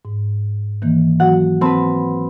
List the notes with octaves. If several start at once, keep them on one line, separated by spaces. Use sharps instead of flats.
G#2
D#3 E3 A#3
F#3 F#4 F#5
C4 B4 A5 B5